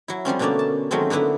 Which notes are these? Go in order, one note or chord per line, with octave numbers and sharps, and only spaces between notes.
F#3 E4
F3 G3 C4 C#4
B2 D3 A3 A#3 C#4 D5
A5
D#3 F#3 G#3 A3 C4 C#4
D3 A#3 B3 E4 B4